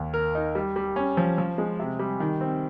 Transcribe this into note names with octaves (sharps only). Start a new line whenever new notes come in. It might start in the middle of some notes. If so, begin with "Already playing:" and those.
Already playing: D#2
A#4
D#4
G3
G3
C#4
F3
F3
G#3
C3
G3
D#3
C4